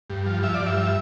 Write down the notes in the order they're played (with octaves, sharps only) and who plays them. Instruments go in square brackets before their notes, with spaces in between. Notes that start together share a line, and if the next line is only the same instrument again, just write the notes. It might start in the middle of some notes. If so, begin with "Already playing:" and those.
[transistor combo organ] G2
F3
F3 E5
D5
G2
E5
F3